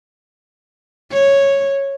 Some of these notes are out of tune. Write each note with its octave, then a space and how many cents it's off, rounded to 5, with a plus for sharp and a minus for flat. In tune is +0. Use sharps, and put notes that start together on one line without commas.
C#5 -5